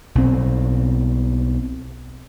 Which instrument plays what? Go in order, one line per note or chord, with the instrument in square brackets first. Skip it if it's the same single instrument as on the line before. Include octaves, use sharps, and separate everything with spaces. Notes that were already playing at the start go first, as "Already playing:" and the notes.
[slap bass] B1 C4